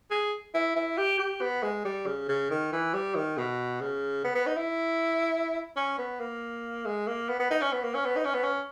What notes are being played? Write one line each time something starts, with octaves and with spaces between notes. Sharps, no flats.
G#4
E4
E4
G4
G4
B3
G#3
G3
C#3
C#3
D#3
E3
G3
D#3
B2
C#3
B3
B3
D#4
E4
C#4
B3
A#3
G#3
A#3
B3
B3
D#4
C#4
B3
A#3
C#4
B3
D#4
C#4
B3
C#4